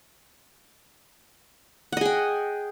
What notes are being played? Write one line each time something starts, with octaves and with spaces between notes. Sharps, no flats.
G#4 D#5 F#5 G5